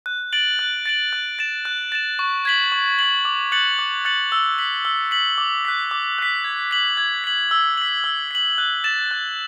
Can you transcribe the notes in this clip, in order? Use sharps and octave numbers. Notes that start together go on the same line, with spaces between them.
F#6
A6 D7 F#7
F#6
A6 D7 F#7
F#6
A6 E7
F#6
A6 E7
C#6
G#6 B6 F#7
C#6
G#6 B6 F#7
D6
F#6 A6 C#7 F#7
D6
F#6 A6 C#7 F#7
E6
B6 F#7
E6
B6 F#7
D6
F#6 B6
D6
F#6 B6
G#6
B6 F#7
G#6
B6 F#7
E6
B6 F#7
E6
B6 F#7
F#6
A6 E7
F#6